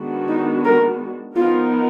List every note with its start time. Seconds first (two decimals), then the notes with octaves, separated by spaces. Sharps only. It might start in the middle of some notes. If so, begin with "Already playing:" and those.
Already playing: D#3 G#3 B3 D4 F#4
0.28 D#4
0.65 A#4
1.36 F3 B3 D#4 F4 A#4